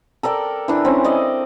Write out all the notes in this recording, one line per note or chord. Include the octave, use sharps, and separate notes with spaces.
A4 A#4 D5 G5
E3 D4
C4 C#4
D5 D#5